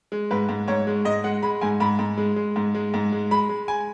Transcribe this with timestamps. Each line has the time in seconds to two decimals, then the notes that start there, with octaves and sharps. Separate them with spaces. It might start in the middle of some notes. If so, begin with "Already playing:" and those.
0.12 G#3
0.31 G#2 B4
0.49 G#2
0.68 G#2 C#5
0.87 G#3
1.05 G#2 D#5
1.24 G#3 F#5
1.42 G#3 B5
1.61 G#2 G#5
1.80 G#2 B5
1.99 G#2
2.18 G#3
2.36 G#3
2.56 G#2
2.75 G#3
2.94 G#2
3.12 G#3
3.31 G#3 B5
3.49 G#3
3.68 G#5